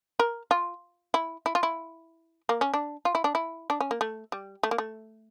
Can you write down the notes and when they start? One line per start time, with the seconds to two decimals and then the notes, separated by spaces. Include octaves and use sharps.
0.20 A#4
0.51 F4
1.14 E4
1.46 E4
1.55 F4
1.63 E4
2.49 A#3
2.61 C#4
2.74 D4
3.05 F4
3.15 E4
3.24 D4
3.35 E4
3.70 D4
3.81 C#4
3.91 A#3
4.01 A3
4.32 G3
4.63 A3
4.71 A#3
4.78 A3